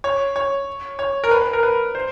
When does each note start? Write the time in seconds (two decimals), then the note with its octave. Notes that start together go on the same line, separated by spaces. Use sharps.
0.04 C#5
0.36 C#5
0.99 C#5
1.24 A#4
1.31 B4
1.42 B4
1.53 A#4
1.63 B4
1.95 C5